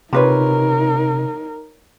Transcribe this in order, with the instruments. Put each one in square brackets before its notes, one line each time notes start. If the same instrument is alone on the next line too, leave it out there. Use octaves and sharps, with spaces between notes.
[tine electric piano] C3 [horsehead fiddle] D#4 A#4 [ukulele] F4 B4 C#5